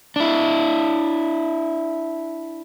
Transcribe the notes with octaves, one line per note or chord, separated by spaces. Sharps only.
D4 E4